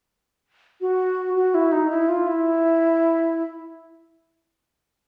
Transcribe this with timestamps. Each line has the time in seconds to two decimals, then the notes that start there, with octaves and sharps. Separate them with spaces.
0.81 F#4
1.36 F#4
1.54 E4
1.72 D#4
1.91 E4
2.09 F4
2.28 E4